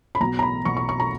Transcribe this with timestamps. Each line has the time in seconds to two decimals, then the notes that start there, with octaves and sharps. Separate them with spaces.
0.15 B5
0.20 B1 B2 F#3 B3 A#5
0.39 A#5
0.42 B5
0.65 B1 B2 F#3 B3 C#6
0.77 C#6
0.89 C#6
1.00 A#5